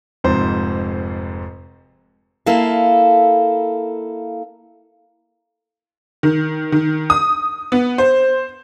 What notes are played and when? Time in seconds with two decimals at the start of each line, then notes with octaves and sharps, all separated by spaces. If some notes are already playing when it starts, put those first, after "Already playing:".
0.24 F1 F2 G#2 C5
2.46 A#3 E4 A4 F5
6.23 D#3
6.72 D#3
7.10 D#6
7.72 B3
7.98 C5